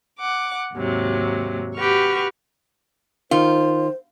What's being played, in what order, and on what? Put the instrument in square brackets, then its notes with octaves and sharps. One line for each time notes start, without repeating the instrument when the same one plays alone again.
[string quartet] F#5 D6
D#2 G#2 C3 F#3
F#4 G4 B4 C#6 F6
[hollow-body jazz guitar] D#3 [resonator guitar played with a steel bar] F4 [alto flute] C5